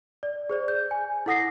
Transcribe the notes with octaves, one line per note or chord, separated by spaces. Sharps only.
D5
G#4 C5 D5
G6
G#5
E4 A4 F#5 D#6 A#6 C7